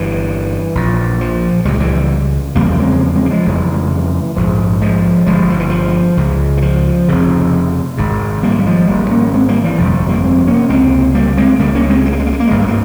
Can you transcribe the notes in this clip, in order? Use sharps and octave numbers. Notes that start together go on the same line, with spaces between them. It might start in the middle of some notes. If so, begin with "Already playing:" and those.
Already playing: G1 G2 E3
A#1 A#2
F3
C#2 C3 G3
G#3
E3 G3
F1 E2 C#3 G3 A#3
G#3 C4
G#3 C4
A#3
F3 G#3
F1 F2 C#3 E3 G3
E3
A#1 G#2 F3
F3 G#3
G1 G2 F3 G#3
F3
E3
F3
C#2 C#3
E3
F3
F1 F2 C#3
G#1 G#2
G3 A#3
G3
F3 G#3
G#1 G#2 G3 A#3
A#3 C#4
G#3 C4
G3 A#3
E3 G3
G1 F2 C3 F3
F3
G3 A#3
G#3 C4
A#3 C#4
C#2 C3 G#3 C4
G3 A#3
G#3 C4
C#2 C#3 G3 A#3
A#3 C#4
G#3 C4
G#3
A#3
G#3
A#3
G#3
A#3
G#3
G#1 G2 A#3
G#3
A#3